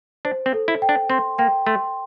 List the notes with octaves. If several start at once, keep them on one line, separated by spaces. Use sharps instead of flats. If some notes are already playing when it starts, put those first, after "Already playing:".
D4 C5
C4
A4
E4
G5
D4
C4 C6
A#3 G5
A3 C6